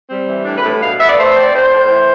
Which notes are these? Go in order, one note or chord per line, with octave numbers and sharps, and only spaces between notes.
G3 C4
E3
A2 D4
B4
A2
B2 F5
B3 E5
D5
A3 C5
C4
D5
A2 C5
A2
E3